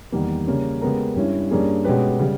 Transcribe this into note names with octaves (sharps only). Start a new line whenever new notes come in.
E2 D#3 G3 A#3
C#3 G3 A#3 C#4
C#3 G#3 B3 G4 A#4
G2 G3 C#4 E4
G2 G3 A#3 C#4 G#4
B2 G#3 C#4 G4 B4
C#3 G3